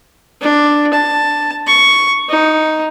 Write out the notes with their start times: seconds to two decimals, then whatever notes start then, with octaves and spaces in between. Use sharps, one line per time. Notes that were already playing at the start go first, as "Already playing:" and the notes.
0.42 D4
0.93 A5
1.67 C#6
2.29 D#4